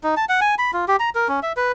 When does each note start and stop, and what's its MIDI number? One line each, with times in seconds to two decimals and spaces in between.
0.04 0.15 63
0.17 0.25 81
0.29 0.40 78
0.41 0.55 80
0.58 0.71 83
0.73 0.85 65
0.88 0.96 67
1.00 1.10 82
1.15 1.28 70
1.28 1.40 61
1.43 1.53 76
1.57 1.72 71